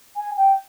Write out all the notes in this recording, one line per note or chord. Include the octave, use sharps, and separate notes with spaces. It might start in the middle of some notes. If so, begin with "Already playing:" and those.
G#5
G5